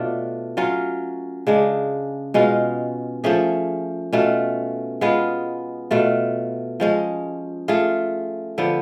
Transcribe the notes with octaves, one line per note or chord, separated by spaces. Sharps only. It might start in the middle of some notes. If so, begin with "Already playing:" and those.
Already playing: B2 A3 D4 F4
F#3 C#4 F4
C#3 G#3 D4
B2 G#3 C#4 F4
F3 A3 C#4 G#4
B2 A3 C#4 F4
G#3 B3 F4 G#4
B2 A3 F4
F3 G#3 C#4
A3 F4 G#4
D3 F3 B3